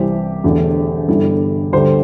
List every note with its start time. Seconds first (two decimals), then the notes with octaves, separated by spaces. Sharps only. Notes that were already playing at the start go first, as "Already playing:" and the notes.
Already playing: C2 C3 E3 G3 G4 C5
0.44 E1 E2 D3 A3
1.08 G1 G2 G3 E4 A4
1.73 D2 D3 G3 G4 C5